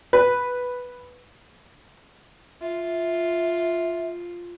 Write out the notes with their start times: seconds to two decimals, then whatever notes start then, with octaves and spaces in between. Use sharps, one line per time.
0.13 B4
2.62 F4 E5